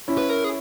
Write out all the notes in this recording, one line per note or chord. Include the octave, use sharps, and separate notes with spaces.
C#4 E4
B4
A#4
G#4